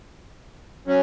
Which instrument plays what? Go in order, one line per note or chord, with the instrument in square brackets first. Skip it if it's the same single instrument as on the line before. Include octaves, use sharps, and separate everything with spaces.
[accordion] F#3 C#4